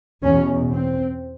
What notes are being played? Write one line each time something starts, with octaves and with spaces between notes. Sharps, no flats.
E2 B2 C#4
C4